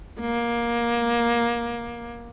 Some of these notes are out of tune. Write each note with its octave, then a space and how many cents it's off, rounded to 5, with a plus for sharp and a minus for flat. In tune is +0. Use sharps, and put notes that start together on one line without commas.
A#3 +20